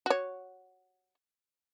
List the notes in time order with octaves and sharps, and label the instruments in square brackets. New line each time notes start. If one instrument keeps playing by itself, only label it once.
[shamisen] F#4 C#5